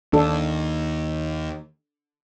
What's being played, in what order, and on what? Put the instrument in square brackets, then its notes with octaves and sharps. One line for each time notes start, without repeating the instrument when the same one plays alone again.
[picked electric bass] D#2 [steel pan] D4 A4